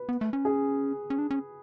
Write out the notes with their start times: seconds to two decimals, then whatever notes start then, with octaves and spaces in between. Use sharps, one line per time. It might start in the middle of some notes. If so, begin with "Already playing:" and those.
Already playing: B4
0.09 B3
0.21 A3
0.33 C#4
0.45 G#4
1.10 C#4
1.18 D4
1.30 C#4